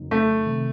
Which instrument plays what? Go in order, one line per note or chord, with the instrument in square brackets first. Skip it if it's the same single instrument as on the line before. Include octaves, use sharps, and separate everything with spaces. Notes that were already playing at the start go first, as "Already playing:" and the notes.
Already playing: [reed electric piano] F2 C#3 F#3 A#3 D#4
[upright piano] A3
[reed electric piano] C3 D#3